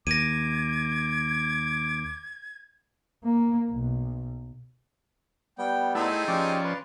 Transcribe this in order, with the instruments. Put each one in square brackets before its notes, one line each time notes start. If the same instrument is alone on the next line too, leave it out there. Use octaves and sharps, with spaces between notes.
[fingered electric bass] D#2 [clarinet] D6 [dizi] G#6 [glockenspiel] A#6 D#7
[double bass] A#3
B1
[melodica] G3 B3 [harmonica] G5
[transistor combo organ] A3 E4 [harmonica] C4 D#4 G#4
[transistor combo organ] F3 C#4 D5 [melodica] G4
[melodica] B4 C6